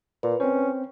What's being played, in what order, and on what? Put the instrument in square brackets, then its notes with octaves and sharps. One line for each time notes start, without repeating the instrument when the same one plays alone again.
[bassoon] A#2 [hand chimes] B4
[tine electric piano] C4 C5 [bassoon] C#4